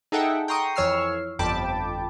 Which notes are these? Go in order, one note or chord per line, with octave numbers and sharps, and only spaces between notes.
D#4 G#4 A4 E5 F#5 G5
G5 A#5 C6 C#6 D#6
F2 E3 C#5 E6 F6 C7
G1 F2 G5 A5 B5 D6